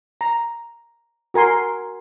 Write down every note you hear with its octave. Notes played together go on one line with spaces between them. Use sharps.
A#5
F#4 A#4 G#5 C6